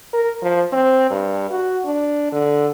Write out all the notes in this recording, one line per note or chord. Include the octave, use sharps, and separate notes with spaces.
A#4
F3
C4
G2
F#4
D4
D3